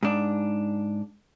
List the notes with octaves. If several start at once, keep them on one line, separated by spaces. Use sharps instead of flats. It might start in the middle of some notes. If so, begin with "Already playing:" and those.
G#2 D4